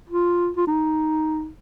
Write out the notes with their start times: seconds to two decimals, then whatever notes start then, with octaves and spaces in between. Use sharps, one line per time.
0.09 F4
0.57 F4
0.67 D#4